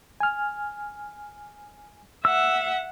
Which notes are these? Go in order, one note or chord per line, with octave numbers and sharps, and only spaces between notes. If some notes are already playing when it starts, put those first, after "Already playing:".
G#5 F6
E5 F#5 E6